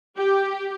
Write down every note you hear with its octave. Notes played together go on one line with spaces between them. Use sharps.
G4